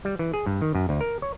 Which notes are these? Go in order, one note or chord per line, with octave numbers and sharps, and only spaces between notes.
G3
E3
G#4
G2
D#3
F#2
D2
A#4
C#5